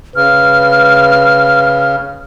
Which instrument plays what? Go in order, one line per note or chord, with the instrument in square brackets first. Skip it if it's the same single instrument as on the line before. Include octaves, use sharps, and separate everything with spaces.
[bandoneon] C#3 [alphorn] B4 [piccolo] F6